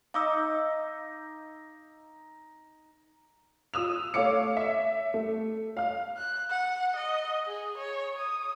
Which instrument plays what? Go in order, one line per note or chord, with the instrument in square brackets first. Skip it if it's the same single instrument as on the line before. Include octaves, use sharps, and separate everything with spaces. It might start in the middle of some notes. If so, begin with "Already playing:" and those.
[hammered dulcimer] D#4 [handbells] F5 D6 E6
[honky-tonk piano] F4 D#6 E6 F7
A3 C#5 F5 D6 C#7
E5
A3
F5 F6
[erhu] F#6
F#5
D#5
G#4
C#5
D#6